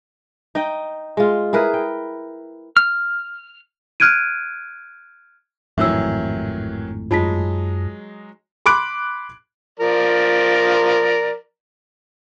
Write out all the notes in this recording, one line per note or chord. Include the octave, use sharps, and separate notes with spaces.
D#4 D#5 G5
G#3 F4
E4 G#4 A#4 B4
G5
F6
F6 F#6 G#6 D7 D#7
G#1 F2 A2 D#3 E3 F#3 E5 E6
F#2 F#3 G#3 D#4 F4 A5 B6
B5 C6 D6 F#6 D7
F3 A#4 D5